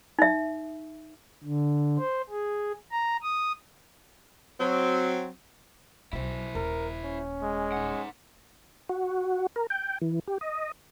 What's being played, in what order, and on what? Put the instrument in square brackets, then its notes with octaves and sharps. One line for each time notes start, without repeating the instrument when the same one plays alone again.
[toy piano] D#4 E5
[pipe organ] D3
C5
G#4
A#5
D#6
[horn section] F#3 C4
[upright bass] B1 B2 [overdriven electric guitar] E4 C5
[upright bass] D#1 [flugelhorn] A#4
[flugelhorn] C#4
[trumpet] G#3
[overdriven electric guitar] D#4 F#5
[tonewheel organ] F#4
A#4
G5
E3
G4
D#5